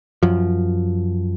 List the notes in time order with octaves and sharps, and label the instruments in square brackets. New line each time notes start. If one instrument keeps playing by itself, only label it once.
[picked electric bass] F#2 F3